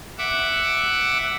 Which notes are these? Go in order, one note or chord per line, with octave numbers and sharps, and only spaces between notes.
E5 F#5 D6